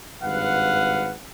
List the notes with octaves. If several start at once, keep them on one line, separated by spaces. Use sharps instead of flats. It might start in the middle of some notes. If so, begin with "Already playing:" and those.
G#1 G2 B4 F5 F#5